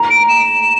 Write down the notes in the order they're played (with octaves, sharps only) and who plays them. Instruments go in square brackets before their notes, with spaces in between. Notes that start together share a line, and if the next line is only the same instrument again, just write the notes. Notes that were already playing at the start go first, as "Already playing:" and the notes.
Already playing: [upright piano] A#5
[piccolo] D7
E7